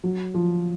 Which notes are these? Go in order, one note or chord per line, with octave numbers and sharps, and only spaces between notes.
F#3
F3